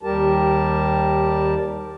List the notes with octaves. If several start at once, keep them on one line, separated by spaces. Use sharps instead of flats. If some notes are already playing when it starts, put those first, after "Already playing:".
D#2 G3 G4 A#4 A5